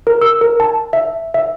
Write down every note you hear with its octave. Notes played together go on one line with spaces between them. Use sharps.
A#4
E6
A#4
A5
E5
E5